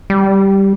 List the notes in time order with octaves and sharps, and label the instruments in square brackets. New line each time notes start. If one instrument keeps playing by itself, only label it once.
[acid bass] G3